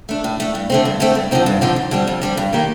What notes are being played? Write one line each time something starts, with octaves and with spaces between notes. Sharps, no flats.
A3 D4
A2
A3 D4
G2
D3 A3 C4
G2
D3 A3 C4
G2
D3 F3 C4 D#4
G2
D3 F3 C4 D#4
F2
D3 G3 C4
F2
D3 G3 C4
G2
D#3 A#3 D#4 G4